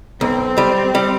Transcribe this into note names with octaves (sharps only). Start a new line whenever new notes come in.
B1 C4
G3
G3